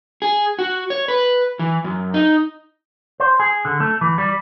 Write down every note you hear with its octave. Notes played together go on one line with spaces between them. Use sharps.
G#4
F#4
C#5
B4
E3
F#2
D#4
C5
G#4
D3
A3
E3
G3